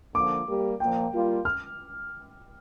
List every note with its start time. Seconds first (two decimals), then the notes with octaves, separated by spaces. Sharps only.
0.14 D3 F3 A#3 F4 D6
0.47 G3 A#3 G4
0.80 A#2 F3 A#3 G5
1.12 G3 A#3 F4
1.45 F6